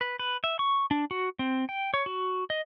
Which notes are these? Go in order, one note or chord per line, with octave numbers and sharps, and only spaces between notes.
B4
B4
E5
C#6
D4
F#4
C4
G5
C#5
F#4
D#5